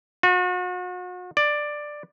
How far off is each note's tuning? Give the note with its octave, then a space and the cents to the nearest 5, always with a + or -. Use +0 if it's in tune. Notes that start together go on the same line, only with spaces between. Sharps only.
F#4 -40
D5 +10